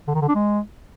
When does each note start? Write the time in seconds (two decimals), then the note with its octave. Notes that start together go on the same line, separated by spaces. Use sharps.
0.08 D3
0.15 D#3
0.21 D3
0.28 D4
0.35 G#3